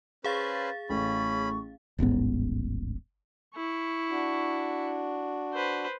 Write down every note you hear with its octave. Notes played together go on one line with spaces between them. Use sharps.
C#4 G#4 B4 C5 F5 A6
A1 A3 C#4 B5 C#6
D#1 A1 G#2 B3
E4 C#6
D4 F#4
B4 C5